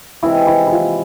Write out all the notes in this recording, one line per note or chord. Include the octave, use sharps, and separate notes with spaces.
C3 E3 G#3 E4
E4
E4
F4